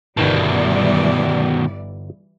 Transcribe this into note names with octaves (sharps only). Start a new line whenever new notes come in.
G1 B2 D#3 E3 G3 D#4 D5 A5